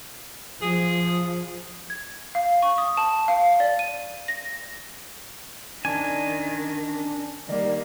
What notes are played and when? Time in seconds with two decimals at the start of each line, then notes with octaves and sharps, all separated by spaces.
0.62 F3 G#4
1.90 G#6
2.35 F5
2.62 C#6
2.78 D#6
2.97 A5
3.28 F5
3.60 D5
3.79 D#7
4.28 A#6
5.85 D#3 C#4 D4 G#5
7.48 D#3 G3 A#3 D5